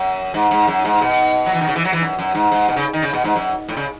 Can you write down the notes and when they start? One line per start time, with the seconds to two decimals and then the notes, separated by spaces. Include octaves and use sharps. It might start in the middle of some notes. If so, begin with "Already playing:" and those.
Already playing: F#2
0.34 G#2
0.51 G#2
0.67 F#2
0.85 G#2
1.01 B2
1.46 F#3
1.54 E3
1.61 D#3
1.67 C#3
1.76 E3
1.85 F#3
1.93 E3
2.01 F#2
2.19 F#2
2.35 G#2
2.52 G#2
2.68 B2
2.76 C#3
2.93 D#3
3.02 C#3
3.13 B2
3.24 G#2
3.36 F#2
3.68 A2
3.77 C#3